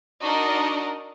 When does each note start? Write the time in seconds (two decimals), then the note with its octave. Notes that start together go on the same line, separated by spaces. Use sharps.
0.21 D4 D#4 F#4 A#4 D#5